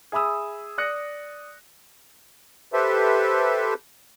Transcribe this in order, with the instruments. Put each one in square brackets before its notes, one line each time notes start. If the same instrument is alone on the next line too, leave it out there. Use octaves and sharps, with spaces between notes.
[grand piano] G#4 E5 B5 D#6 E6
D5 D#6 F#6 A#6 C#7
[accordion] G4 A4 B4 C5 E5